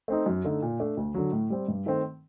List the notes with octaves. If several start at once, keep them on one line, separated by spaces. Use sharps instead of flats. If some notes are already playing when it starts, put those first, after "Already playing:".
A3 C4 D#4
F#2
D3 A3 D#4
A#2
A3 D4
D2
D3 F#3
A2
G3 C4
G2
D#3 A3 C4